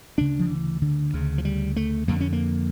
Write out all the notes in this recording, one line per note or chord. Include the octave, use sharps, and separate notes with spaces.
D2 C#3 D4
F3
E3
D3
D2 C#3
F3
G3
A3
F2 D3 A#3
C#4
A#3